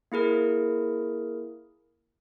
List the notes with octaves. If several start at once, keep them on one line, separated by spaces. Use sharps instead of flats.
A#3 E4 G#4 A#4